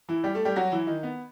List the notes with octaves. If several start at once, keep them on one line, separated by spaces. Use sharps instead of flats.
E3 E4
G3 G4
A3 A4
G3 G4
F#3 F#4
E3 E4
D#3 D#4
B3